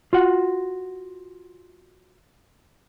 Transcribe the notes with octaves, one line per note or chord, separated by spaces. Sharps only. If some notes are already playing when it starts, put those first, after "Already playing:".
F4 F#4 F#5